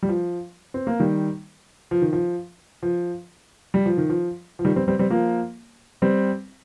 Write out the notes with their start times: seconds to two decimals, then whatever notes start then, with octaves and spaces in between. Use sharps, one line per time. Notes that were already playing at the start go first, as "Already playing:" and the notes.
0.03 G3
0.09 F3
0.74 C4
0.87 A#3
1.00 D#3 G3
1.91 F3
2.02 D#3
2.13 F3
2.83 F3
3.74 G3
3.86 F3
3.97 D#3
4.09 F3
4.59 F3
4.65 D#3 G3
4.76 G3 C4
4.88 G3 C4
4.99 G3 C4
5.10 F3 A#3
6.02 G3 C4